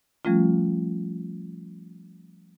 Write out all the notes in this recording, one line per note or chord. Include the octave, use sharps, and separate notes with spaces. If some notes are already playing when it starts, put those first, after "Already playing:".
F3 G3 A3 C#4 F4